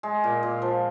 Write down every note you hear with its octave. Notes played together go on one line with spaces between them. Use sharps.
G#3
A#2
A#2
F3